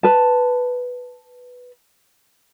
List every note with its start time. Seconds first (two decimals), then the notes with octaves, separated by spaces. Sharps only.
0.03 B4 A5